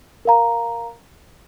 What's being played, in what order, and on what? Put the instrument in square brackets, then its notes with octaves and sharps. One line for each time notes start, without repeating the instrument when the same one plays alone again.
[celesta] A#4 F5 A#5